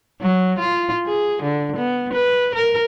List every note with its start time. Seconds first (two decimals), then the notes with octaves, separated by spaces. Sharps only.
0.21 F#3
0.59 F4
1.06 G#4
1.43 D3
1.76 B3
2.13 B4
2.55 A#4